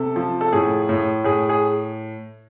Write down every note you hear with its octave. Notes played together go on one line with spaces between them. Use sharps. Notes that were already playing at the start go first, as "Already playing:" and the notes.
Already playing: C3 A4
F3
A4
A2 G#4
A2
A2 G#4
G#4